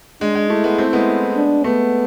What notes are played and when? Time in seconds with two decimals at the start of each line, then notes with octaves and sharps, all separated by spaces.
0.21 G#3 D4
0.35 G#3
0.49 A3 E4
0.64 G#3 B3
0.78 A3 C4
0.93 G#3 B3
1.36 D4
1.64 A3 B3